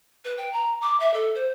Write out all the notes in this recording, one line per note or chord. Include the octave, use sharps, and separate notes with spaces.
B4
G5
A#5
D6
E5
A4
C5